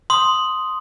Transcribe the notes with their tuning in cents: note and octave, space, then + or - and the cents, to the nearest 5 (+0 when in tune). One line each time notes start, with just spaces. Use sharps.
C6 +0 D#6 +0